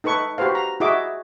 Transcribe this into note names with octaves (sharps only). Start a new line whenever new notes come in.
D#4 A4 B4 C#6
F#4 G4 B4 C5 F5
A#5
E4 F#4 G#4 D#5 E5 D6